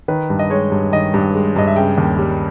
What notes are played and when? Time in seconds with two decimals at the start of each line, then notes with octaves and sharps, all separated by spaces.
0.08 D#3 B4
0.30 G2
0.39 D#5
0.50 G#3 C#5
0.72 G2
0.92 D#3 D#5
1.14 G2
1.34 G#3
1.56 G2 D#5
1.67 E5
1.76 C#3 G5
1.98 D#2
2.18 G3